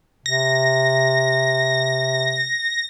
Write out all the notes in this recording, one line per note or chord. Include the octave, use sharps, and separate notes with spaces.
C3 A#6